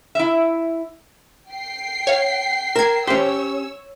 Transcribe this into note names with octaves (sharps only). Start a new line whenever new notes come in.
E4 E5
G5 C7
C#5 F5
A#4 G#6 E7
C#4 G4 C5 C#5 E6